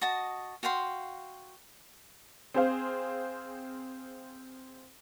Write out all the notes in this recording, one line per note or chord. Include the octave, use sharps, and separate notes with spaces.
F#4 D#5 A5
F#4 F5 G5 C6
C4 G#4 C5 F5